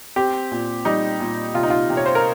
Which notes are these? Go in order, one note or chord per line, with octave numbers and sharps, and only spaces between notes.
C4 G4
A#2
G3 D#4
A#2
C3 F4
D#4
F4
C3
C#5
C5
A#4